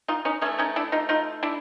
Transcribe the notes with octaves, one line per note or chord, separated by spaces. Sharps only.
D#4 F4
C#4 D#4
E3 A3 C#4 D#4
C#4 D#4
D4 E4
D#4 F4
D#4 F4
D4 E4